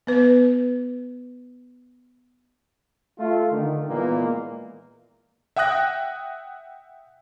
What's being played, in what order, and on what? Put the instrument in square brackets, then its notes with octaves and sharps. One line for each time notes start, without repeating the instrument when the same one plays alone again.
[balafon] B3 B4
[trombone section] A3 F4
D3 D#3
A#2 E3 G#3 A#3 B3
[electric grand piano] E5 F#5 G5 D#6 F#6 A#6